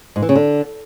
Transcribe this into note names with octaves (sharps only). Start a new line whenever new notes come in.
G#2
E3
C#3
D3